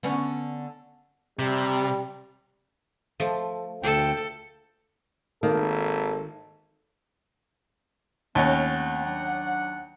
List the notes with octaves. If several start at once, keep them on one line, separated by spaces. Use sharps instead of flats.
D3 B3 C#4
C3 G3
F3 A3
D2 A4 G5
G#1 D#3 A#3 A4
D#2 A3 C4 C#4 F#5
F#3 D4 F#5